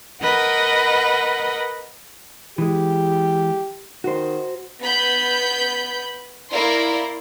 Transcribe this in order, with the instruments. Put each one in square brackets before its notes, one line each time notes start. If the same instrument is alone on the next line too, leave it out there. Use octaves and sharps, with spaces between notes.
[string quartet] A#4 B4 D#5 F#5
[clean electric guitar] E3 G#3 [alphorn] G4
[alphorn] D#3 [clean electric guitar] F#4 C5
[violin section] B3 B5 G6
A#3 E4 A#4 D5 C6